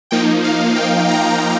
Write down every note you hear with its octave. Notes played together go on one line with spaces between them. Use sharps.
F3 A#3 D#4 G5
F5
G5
A#5